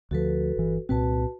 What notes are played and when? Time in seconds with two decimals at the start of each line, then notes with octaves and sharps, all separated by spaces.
0.11 D2 F3 F#4 A4 B4
0.57 G1 E3
0.89 C2 A#2 C4 F#4 B4 A5